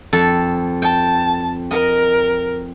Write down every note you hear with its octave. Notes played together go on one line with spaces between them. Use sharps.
F2 A4
G5 A5
A#4 D#5